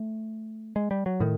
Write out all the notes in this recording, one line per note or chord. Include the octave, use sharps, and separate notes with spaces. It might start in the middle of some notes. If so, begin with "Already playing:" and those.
Already playing: A3
G#3
G3
F#3
A2 D#3